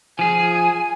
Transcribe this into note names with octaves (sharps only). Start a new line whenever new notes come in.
F3 G#4 G#5